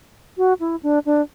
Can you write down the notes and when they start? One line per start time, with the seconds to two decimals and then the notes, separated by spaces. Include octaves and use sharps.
0.38 F#4
0.60 E4
0.83 D4
1.06 D4